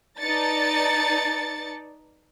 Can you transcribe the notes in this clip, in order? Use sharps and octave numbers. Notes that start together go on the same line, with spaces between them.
D#4 B4 D5 A5 A6 C#7